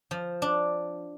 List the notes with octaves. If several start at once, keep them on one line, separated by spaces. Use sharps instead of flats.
F3
D4